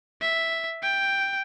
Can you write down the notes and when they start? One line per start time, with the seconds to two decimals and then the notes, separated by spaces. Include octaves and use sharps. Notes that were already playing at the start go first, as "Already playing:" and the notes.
0.21 E5
0.83 G5